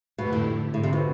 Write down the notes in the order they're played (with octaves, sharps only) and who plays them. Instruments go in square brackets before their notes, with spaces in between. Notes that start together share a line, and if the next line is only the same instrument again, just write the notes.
[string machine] F2 D3 A3 E4 G4 [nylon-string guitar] B2
[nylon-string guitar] A2
[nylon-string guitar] A2 [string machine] D3 F3 C4
[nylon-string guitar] C3
B2